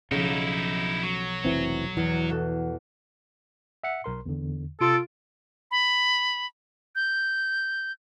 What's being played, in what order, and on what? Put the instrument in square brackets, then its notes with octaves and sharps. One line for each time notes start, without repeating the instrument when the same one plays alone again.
[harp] B1 F3 [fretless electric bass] C#3 [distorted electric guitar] D#4 E4
[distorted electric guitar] F#3
[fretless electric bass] F1 E3 C4
[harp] E2 [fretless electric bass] E3
[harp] B2 F#4 A4
[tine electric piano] E5 F#5 C#7
B1 A#4 C6
E2 D3
[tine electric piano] C3 D#6 [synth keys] F4 A6 D7 [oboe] A4
[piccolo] B5
G6